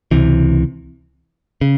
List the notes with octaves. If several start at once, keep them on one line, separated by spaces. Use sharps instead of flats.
C#2 C3 E3
C#3